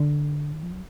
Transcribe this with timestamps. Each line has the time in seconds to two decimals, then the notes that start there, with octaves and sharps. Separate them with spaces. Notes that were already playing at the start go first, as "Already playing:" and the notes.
Already playing: D3
0.53 D#3
0.63 F3
0.72 F#3